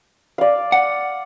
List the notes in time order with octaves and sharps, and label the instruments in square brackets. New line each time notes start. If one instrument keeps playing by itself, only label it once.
[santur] D5 F5
[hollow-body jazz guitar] F#5